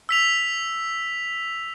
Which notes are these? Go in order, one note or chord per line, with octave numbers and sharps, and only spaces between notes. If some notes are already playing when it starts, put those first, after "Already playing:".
E6 B6 F7